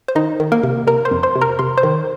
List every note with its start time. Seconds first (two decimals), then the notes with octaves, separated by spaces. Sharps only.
0.08 C5
0.15 D#3 D#4 D#5
0.40 D#3
0.52 A#3 A#4
0.63 C3
0.87 C3 A#4 A#5
1.05 C5 C6
1.11 F2
1.23 C5 C6
1.36 C3
1.41 A#4 A#5
1.59 C3 C6
1.77 C5 C6
1.83 D#3